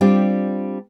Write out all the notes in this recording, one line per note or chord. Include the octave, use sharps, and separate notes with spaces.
G3 C4 D4 F4 G4